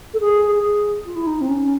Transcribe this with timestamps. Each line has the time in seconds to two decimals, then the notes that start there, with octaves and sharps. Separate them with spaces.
0.14 A4
0.20 G#4
0.55 G#4
1.05 F4
1.15 E4
1.26 D#4
1.41 C4
1.48 C#4